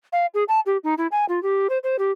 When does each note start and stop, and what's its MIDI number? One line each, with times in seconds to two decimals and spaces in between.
0.12 0.26 77
0.34 0.44 68
0.48 0.60 81
0.66 0.77 67
0.84 0.94 63
0.98 1.07 64
1.12 1.25 80
1.29 1.42 65
1.43 1.67 67
1.70 1.78 72
1.84 1.96 72
1.99 2.11 67